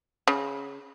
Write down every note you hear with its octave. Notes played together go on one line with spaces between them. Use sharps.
C#3